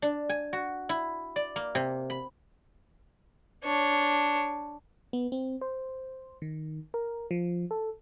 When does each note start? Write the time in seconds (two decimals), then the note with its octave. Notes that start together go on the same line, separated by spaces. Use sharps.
0.02 D4
0.29 G#5
0.53 F#4
0.89 E4
1.36 D5
1.56 A#3
1.75 C3
2.10 B5
3.64 D4 C#5
5.13 B3
5.32 C4
5.61 C5
6.42 D#3
6.94 A#4
7.31 F3
7.71 A4